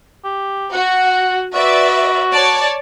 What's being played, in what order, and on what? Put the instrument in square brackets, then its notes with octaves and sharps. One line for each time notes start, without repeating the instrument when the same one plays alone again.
[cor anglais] G4
[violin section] F#4 [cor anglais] F#5
[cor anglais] F#4 [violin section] B4 D5 E5
[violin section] C#5 D5 A5